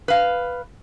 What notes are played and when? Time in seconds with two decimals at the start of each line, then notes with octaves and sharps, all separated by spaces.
0.08 B4 F5